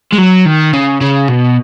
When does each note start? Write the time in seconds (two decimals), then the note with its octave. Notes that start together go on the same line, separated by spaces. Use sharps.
0.12 G#3
0.18 F#3
0.46 D#3
0.74 C#3
1.01 C#3
1.29 B2